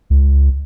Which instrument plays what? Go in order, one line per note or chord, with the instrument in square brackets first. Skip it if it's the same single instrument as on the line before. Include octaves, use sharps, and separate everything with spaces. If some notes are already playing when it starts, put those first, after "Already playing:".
[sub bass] C#2